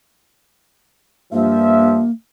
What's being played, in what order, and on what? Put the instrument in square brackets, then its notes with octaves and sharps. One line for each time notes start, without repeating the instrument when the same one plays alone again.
[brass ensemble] G2 F3 E5 [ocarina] A#3